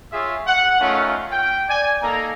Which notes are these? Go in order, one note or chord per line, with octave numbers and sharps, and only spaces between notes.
F4 G#4 C#5 E5
F#5
A3 C#4 D#4 F4 A#4 F5
G5
D5 G#5
A#3 D#4 A4 A#5